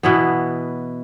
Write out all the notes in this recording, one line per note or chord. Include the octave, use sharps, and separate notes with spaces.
B2 E3 B3